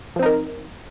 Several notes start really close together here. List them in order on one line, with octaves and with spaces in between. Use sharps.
F3 C4 D#4 A#4